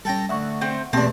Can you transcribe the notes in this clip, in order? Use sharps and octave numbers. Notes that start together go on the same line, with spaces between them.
G3 C#4 A4 G5 A#5
D2 E5 F#5 C#6
A3 C4 G5
E2 B2 A3 A#3 C4 D4 G4